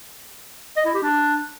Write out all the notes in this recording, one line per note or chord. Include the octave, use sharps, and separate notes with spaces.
D#5
E4
G4
D4